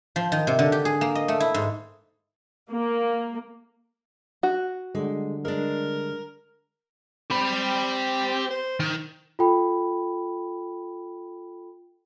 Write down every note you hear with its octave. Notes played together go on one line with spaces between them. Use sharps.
F3
D#3
C3
D3
G4
G#4
A#3
D#5
A3
E4
G#2
A#3
F#4
D3 G3 G#3
G#3 D4 A#4
C4 G4 B5
C5
D#3
F4 A4 G5 B5